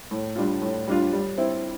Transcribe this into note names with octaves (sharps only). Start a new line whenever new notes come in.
A2
G3 D4 F4
A2
G3 D4 F4
G3
C4 E4